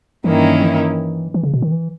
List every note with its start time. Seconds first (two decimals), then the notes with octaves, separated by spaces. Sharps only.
0.24 G2 D#3 E3 A#3 C#4 E4
0.62 E3
1.34 E3
1.43 C#3
1.54 B2
1.62 D#3
1.72 E3